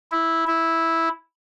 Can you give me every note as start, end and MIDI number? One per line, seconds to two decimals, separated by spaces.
0.12 0.44 64
0.47 1.09 64